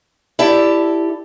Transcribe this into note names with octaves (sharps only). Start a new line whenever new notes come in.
E4 G4 A4 D5